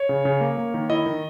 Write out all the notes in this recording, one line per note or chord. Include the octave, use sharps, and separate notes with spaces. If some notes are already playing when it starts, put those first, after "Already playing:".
Already playing: C#5
C#3
C#3
A#3
A#3
D#3
E4 D#5
D#3